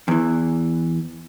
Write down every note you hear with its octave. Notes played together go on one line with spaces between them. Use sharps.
E2 E3